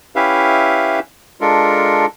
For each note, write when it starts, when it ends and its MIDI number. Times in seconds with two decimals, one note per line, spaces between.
0.16 0.99 61
0.16 0.99 64
0.16 0.99 67
0.16 0.99 71
0.16 0.99 76
0.16 0.99 77
1.41 2.06 56
1.41 2.06 62
1.41 2.06 65
1.41 2.06 69
1.41 2.06 70